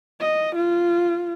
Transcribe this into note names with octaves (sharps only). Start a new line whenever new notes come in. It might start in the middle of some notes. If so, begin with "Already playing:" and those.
D#5
F4